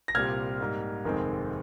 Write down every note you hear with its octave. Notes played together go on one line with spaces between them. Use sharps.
A#6
C2 A#2 G3 C4 F6 G#6
G#2 G3 A#3
F1 D#2 D#3 G#3 C4